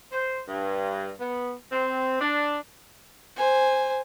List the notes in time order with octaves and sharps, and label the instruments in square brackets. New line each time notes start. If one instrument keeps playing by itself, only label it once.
[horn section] C5
G2
B3
C4
D4
[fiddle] C5 G#5